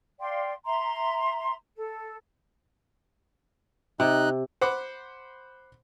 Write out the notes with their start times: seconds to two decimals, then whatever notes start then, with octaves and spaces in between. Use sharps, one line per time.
0.20 D5 F5 G5 C6
0.65 E5 A#5 C6
1.75 A4
4.00 C3 D#4 F#6
4.61 C5 F#5 B5 D6